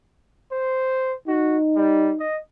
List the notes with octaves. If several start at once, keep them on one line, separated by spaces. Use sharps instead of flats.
C5
D#4 F#4
G3
D#5